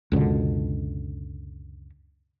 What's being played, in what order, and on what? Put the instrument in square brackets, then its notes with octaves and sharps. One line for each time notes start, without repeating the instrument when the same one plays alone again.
[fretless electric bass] C#2 F#2 B2 D3